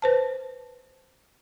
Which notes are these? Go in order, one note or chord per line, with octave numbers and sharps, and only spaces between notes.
B4 C5 A5